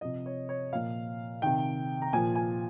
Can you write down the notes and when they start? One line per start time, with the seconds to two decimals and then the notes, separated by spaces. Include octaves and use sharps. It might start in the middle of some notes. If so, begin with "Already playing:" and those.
0.01 C3 F3 D#5
0.26 C#5
0.49 C#5
0.73 A#2 F3 F5
1.42 C3 D#3 G5
2.02 A#5
2.13 A#2 F3 G#5
2.36 G#5